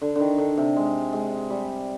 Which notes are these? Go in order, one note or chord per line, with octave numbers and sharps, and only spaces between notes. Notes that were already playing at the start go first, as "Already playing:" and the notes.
D3
D3 D#3
D3
C3
G#3
G#3
G3